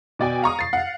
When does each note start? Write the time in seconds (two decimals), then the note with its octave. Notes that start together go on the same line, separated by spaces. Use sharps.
0.19 B2 D5 G5 G#5
0.42 F5 A#5 C#6 D#6
0.59 A6 C7
0.73 F5 F#5